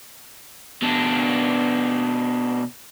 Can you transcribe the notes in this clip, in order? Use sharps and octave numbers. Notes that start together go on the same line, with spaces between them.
B2 D4